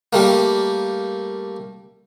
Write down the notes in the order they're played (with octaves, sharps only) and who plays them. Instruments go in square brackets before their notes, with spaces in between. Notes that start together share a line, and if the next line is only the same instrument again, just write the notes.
[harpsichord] G3 A3 A#3